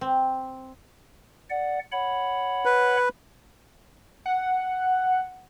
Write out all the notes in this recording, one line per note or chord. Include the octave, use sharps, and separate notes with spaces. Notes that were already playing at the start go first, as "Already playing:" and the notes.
C4
D5 F#5
C#5 F#5 B5
B4
F#5